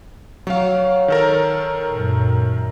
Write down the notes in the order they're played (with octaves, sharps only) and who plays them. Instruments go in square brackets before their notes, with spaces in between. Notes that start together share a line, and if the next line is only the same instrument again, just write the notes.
[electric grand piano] F#3 F5 [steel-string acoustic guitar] C#5
[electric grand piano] D#3 A4 A#4
[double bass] F#2 A#2